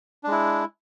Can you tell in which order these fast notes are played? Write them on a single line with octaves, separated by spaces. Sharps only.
D4 G#3 E4